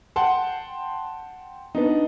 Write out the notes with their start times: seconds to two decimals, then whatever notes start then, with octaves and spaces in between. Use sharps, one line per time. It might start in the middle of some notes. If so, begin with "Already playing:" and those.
0.16 F#5 G5 A5 C6
1.75 B3 D4 D#4